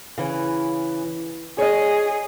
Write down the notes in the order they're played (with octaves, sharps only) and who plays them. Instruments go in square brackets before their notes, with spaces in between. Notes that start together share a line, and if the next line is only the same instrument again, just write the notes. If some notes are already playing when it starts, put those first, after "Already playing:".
[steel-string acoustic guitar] C#3 E3 C#4
[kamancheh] G#4 [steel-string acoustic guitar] C#5 D#5